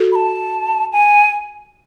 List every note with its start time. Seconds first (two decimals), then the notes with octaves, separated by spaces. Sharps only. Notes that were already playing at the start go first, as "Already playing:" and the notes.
Already playing: F#4 A4
0.12 B5
0.15 A5
0.93 G#5